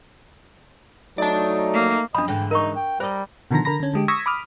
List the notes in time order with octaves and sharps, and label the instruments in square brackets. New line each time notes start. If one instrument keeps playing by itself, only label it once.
[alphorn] F#3 [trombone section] A3 D#4 [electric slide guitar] D5 A5
[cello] A#3
[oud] F#2 F3 [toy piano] D4 B5 [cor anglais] D#5
[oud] G#2 D3 E3 [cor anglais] G5
[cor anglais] D#4 [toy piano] A#4 C#6
[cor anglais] G5
[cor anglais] G3 [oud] A#4 D#5 [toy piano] C5
[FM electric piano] B2 D3 D#3 F3 A#5 A#6
D3 A#4 A#5 B5 A#6
D3 C#4
D3 G#3 G4
C#6 D#6 E6 G#6 A#6 B6
B5 D6 D#6 F6